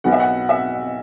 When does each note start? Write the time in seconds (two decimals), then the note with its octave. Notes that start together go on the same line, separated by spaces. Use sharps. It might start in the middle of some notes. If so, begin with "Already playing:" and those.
0.04 B1 B2 B3 F#5
0.12 E5
0.20 F#5
0.49 E5